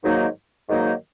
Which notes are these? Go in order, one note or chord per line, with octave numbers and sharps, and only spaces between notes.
G#2 D#3 F#3 A#3 D#4
G#2 D#3 F#3 A#3 D#4